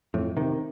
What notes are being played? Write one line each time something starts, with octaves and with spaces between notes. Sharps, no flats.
F2 A2
C3 D#3